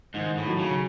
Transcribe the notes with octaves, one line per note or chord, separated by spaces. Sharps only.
G#2 D#3
A2
F#3
C#3